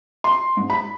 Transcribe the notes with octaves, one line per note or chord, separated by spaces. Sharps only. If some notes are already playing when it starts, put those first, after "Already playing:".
C6
G#2
B5